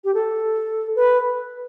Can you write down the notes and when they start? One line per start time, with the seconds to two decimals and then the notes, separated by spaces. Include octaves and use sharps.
0.04 G4
0.14 A4
0.96 B4